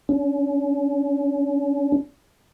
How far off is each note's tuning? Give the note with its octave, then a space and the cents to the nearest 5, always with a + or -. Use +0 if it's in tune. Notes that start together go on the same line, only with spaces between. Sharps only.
C#4 +35